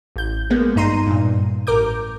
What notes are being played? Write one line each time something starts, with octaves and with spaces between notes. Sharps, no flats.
A1 G6
G#3 A#3 B3
G#1 G2 D#4 A#5 C6 D#7
G2 A#2
A1 A#4 D6 G6